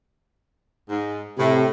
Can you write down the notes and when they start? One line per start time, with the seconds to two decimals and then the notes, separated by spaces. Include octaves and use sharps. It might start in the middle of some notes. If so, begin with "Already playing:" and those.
0.89 G#2
1.38 A2 C3